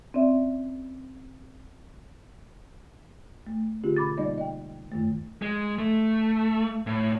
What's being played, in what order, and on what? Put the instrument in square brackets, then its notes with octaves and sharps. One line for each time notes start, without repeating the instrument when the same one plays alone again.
[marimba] C4 C#4 D5 E5
A3
D3 C#4 F4 G4 G#4
B2 B5 D6 A6
G3 A#3 D#4 D5 D#5
D#5 G5
F#2 D#3 A3
[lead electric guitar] G#3
A3
A2